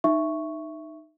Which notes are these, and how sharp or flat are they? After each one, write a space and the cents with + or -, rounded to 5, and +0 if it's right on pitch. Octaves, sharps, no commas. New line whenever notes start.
D#4 -15 E5 +5 C#6 +0